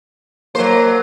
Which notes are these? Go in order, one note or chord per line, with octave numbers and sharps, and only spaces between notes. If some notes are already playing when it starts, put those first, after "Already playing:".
F#3 A#3 C5